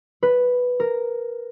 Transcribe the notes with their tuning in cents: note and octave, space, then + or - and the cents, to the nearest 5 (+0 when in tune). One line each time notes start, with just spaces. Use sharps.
B4 +0
A#4 -5